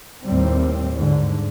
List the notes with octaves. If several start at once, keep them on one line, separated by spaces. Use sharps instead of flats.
D#2 A2 G3 C4
G#2 D3